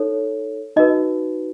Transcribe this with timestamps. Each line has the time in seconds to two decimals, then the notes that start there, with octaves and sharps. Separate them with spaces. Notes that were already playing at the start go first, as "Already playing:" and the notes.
Already playing: D#4 A4 C#5
0.76 D#4 F#4 B4 D#5